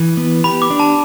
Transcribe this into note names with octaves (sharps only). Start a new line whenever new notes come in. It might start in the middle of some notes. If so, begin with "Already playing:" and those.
Already playing: E3
B3
G4 B5
D6
D4
A5